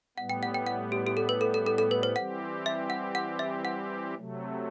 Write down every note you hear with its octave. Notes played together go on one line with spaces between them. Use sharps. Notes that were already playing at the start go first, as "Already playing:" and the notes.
A2 G3 B3 F#5
G5
F#5
G5
F#5
G4
G4
A4
B4
A4
A4
A4
A4
B4
C5
E3 G3 C4 G4 F#5
E5
F#5
F#5
E5
F#5
C3 F#3 A3